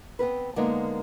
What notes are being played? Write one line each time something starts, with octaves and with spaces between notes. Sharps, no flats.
B3 C4 A#4 B4
D3 G#3 A#3 B3 D#4 A#4